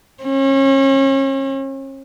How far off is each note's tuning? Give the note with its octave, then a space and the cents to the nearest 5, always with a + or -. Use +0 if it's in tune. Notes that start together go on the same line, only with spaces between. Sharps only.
C#4 -35